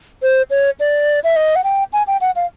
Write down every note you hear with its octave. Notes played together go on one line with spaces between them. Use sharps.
C5
C#5
D5
E5
D#5
F#5
G5
G#5
G5
F#5
F5